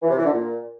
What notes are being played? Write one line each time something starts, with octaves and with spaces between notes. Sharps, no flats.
E3
C3
E3
D3
A#2